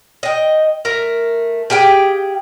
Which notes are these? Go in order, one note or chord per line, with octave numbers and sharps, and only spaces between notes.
D#5 G5
A3 A#4
G4 G#4 F5 G5